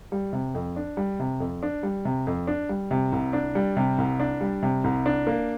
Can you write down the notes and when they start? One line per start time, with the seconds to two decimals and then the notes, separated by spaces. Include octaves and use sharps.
0.12 G3
0.33 C3
0.55 F2
0.76 D4
0.97 G3
1.20 C3
1.40 F2
1.63 D4
1.83 G3
2.05 C3
2.27 F2
2.47 D4
2.69 G3
2.91 C3
3.12 C2
3.33 D4
3.55 G3
3.77 C3
3.98 C2
4.20 D4
4.41 G3
4.63 C3
4.84 C2
5.06 D4
5.27 A#3